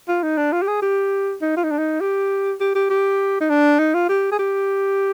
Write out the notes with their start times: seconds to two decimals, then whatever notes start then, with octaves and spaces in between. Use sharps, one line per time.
0.08 F4
0.23 D#4
0.37 D4
0.52 F4
0.62 G4
0.67 G#4
0.82 G4
1.42 D#4
1.57 F4
1.64 D#4
1.71 D4
1.78 D#4
2.00 G4
2.60 G4
2.75 G4
2.90 G4
3.40 D#4
3.50 D4
3.79 D#4
3.94 F4
4.09 G4
4.32 G#4
4.39 G4